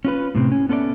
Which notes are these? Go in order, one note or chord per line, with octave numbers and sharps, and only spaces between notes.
C#4 F4 B4
A2 C3 C4
C#4
B3 C#4 A4 B4 D5 E5